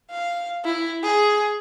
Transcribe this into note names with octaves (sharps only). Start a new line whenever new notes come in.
F5
E4
G#4